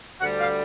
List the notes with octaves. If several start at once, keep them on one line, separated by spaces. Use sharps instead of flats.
D2 D3 G3 F#5
F5